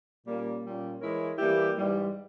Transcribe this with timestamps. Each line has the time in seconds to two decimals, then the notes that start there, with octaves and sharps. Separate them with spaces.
0.24 A#2 G3 A#3 C#4
0.63 A#2 G3 C#4
1.00 E3 G#3 E4 A#4 C#5
1.38 E3 G3 A#3 E4 G4
1.76 G#2 E3 G3